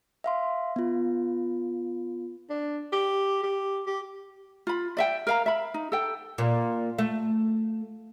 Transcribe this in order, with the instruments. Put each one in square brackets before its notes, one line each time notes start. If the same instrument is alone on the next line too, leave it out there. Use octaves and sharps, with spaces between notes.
[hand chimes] E5 F5 C6
B3 F4
[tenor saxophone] D4
G4
G4
G4
[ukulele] F4 B5
D5 E5 G5
A#4 F5 A#5
E5 B5
D#4
A4 G5
[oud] A#2
A3